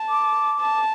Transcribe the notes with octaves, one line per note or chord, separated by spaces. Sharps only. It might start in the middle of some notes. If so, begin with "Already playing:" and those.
Already playing: A5
D6
A5